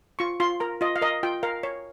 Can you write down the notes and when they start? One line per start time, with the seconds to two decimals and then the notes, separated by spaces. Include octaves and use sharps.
0.19 F4 C#6
0.40 F4 C6
0.60 A#4 A#5
0.81 F4 D#5
0.96 F5
1.02 A#4 D#5
1.23 F4 G5
1.43 A#4 F5
1.63 C#5